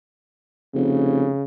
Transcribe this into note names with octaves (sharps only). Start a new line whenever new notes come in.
F1 C#3